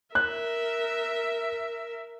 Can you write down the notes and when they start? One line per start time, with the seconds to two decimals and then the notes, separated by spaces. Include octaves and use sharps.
0.15 A#4 E5 F#6